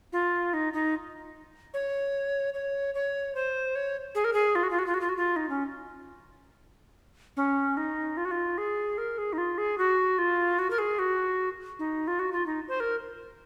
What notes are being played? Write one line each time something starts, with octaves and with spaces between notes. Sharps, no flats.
F4
D#4
D#4
C#5
C#5
C#5
C5
C#5
G#4
A#4
G#4
F4
F#4
F4
F#4
F4
F#4
F4
F#4
F4
D#4
C#4
C#4
D#4
F4
F#4
F4
G#4
A#4
G#4
D#4
F4
G#4
F#4
F4
F#4
A#4
G#4
F#4
D#4
F4
F#4
F4
D#4
C5
A#4